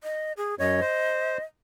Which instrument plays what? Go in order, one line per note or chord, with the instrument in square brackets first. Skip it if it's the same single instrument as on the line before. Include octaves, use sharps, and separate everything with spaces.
[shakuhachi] D#5
G#4
[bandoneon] F#2 C#5 [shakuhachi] D#5
[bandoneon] C5